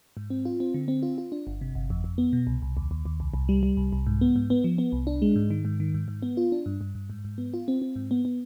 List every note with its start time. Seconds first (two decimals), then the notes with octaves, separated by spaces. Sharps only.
0.17 G#2
0.30 C4
0.45 F4
0.60 C4
0.74 D3
0.88 C4
1.03 F4
1.18 F4
1.32 D4
1.47 G1
1.61 C3
1.75 G1
1.90 F2
2.04 F2
2.18 B3
2.33 B2
2.47 C2
2.62 C2
2.77 D#2
2.91 D#2
3.06 D#2
3.20 C2
3.34 C2
3.49 G3
3.63 G3
3.77 C2
3.93 C2
4.07 G#2
4.21 B3
4.36 G#2
4.50 B3
4.64 F3
4.78 B3
4.92 C2
5.07 D4
5.22 G#3
5.36 G#2
5.51 D#3
5.65 G#2
5.80 D#3
5.94 G#2
6.08 G#2
6.22 B3
6.37 F4
6.52 D4
6.66 G2
6.81 G2
6.95 G2
7.10 G#2
7.25 G#2
7.38 B3
7.54 F4
7.68 C4
7.82 C4
7.96 G#2
8.11 B3
8.25 B3